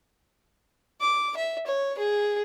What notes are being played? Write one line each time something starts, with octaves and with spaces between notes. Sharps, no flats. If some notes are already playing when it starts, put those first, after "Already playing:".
D6
E5
C#5
G#4